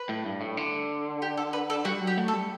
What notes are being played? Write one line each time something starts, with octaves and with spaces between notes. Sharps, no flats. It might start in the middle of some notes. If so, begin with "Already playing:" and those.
Already playing: B4
A2
G2
A2
D3
G4
A4
B4
A4
G3 F#4
F#3
G4
A3
A4
G3